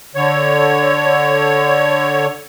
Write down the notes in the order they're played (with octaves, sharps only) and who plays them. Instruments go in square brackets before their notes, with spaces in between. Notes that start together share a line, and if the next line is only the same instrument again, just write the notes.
[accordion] D3 C#5